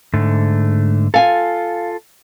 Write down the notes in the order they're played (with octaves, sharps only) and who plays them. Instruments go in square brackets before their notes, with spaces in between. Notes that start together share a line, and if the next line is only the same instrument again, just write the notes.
[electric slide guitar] G#2 D3 A3
[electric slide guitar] F4 A4 [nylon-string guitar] F5 G#5